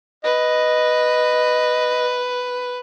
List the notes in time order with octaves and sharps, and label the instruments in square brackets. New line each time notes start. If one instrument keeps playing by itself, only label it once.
[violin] B4 [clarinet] D#5